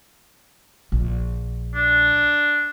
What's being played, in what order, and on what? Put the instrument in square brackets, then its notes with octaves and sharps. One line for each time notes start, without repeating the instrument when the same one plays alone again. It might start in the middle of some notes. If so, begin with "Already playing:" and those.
[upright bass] A#1
[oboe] D4